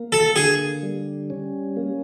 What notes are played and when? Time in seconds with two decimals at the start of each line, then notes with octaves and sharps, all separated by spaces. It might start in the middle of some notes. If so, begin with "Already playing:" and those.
Already playing: A#3
0.12 A4
0.36 D3 G#4
0.83 G3
1.30 C#4
1.77 A#3